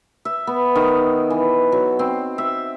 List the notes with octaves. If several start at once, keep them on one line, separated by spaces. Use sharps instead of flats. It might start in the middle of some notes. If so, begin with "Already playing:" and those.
E5
B3
D#3
E3
F#3
C4
E5